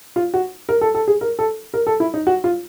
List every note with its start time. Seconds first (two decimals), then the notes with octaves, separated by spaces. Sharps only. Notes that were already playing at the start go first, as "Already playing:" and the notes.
0.16 F4
0.34 F#4
0.69 A#4
0.81 A4
0.95 A4
1.08 G#4
1.21 A#4
1.39 A4
1.74 A#4
1.87 A4
2.00 E4
2.14 D#4
2.27 F#4
2.44 F4